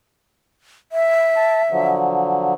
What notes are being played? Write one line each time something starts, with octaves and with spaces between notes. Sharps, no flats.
E5
A5
D3 F3 F#3